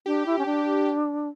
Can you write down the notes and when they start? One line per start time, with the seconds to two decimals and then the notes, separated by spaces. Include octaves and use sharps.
0.06 D4 G4
0.26 E4
0.38 C#4
0.46 D4